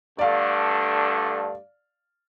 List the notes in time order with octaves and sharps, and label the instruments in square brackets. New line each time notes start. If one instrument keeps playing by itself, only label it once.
[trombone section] G2 D3 A3 [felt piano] D5 F5